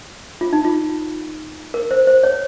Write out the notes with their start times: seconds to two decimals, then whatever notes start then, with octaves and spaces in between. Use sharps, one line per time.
0.41 F4
0.53 D#4
0.65 F4
1.74 A#4
1.91 C5
2.07 C5
2.23 C#5